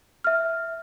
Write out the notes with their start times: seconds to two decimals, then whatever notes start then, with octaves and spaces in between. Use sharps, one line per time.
0.24 E5 F6